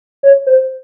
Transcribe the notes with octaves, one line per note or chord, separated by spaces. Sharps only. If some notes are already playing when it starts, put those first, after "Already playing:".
C#5
C5